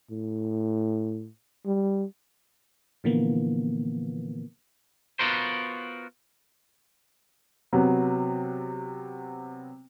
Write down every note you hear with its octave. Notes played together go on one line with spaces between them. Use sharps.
A2
G3
A#2 D3 E3 F3 A#3 B3
B3 F4 F#4 A#4 C5
C3 F#3 B3